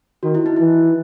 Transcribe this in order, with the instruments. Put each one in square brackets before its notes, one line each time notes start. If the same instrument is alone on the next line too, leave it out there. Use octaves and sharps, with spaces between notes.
[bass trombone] D#3 [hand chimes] F#4
[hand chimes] E4
D#4
[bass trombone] E3 [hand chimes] E4